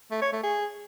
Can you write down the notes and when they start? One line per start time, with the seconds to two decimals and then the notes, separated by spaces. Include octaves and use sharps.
0.11 A3
0.22 C#5
0.32 A3
0.43 G#4